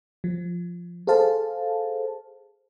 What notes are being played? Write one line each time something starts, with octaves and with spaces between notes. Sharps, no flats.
F3
G#4 A4 C5 F5 A5